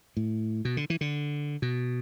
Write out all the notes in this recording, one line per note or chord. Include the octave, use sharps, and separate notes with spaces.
A2
B2
D3
E3
D3
B2